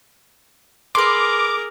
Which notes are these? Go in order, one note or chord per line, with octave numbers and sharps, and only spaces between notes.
G#4 A#4 B4 C6 D6